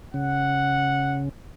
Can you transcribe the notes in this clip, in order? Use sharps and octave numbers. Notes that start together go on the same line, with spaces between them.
C#3 F#5